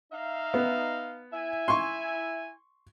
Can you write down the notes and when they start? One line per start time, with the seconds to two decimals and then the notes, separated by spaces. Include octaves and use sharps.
0.12 D#4 E5 F5
0.54 B3
1.33 E4 E5 G#5
1.68 C6 C#6